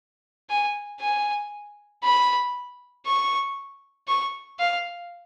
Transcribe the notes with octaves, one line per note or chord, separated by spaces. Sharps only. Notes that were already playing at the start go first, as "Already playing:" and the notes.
G#5
G#5
B5
C#6
C#6
F5